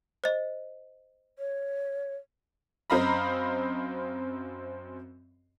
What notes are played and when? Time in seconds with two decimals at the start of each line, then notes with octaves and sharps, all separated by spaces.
0.24 C5 D#5
1.39 C#5
2.90 F#2 C4 D#5 F5 A#5 B5